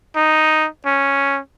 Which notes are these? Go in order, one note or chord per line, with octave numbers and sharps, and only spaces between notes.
D#4
C#4